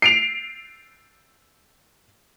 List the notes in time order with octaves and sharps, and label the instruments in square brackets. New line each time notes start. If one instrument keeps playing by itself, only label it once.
[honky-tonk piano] C7 D7 F7